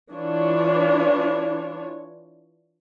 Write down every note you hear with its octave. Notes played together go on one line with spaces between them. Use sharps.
E3 D4 F4 C#5